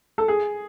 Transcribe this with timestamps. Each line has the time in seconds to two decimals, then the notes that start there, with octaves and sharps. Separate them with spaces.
0.18 A4
0.28 G#4